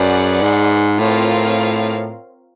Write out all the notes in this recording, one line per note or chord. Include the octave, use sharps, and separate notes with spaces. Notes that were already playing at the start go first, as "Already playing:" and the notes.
Already playing: F#2 G#4 B4 D5 F#5
G#2
A2 C4 F4 A#4 C#5 F5